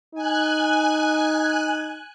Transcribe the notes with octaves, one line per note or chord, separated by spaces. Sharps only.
D#4 G#5 F#6